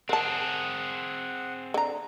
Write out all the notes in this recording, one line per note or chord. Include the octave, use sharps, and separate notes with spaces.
C4 G#4 A#4 F#5 A5
D3 A#5